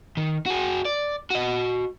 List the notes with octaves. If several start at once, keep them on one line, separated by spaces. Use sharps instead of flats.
D#3
F#4 G#4
D5
F#4 D#5